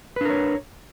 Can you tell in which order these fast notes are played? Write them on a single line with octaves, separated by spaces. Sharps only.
B4 D4 A#4 C#5